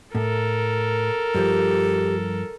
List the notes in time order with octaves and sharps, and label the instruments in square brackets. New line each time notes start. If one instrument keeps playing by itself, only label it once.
[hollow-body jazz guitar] A2 [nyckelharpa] A4 A#4
[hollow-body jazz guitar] G2 F3 [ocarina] G4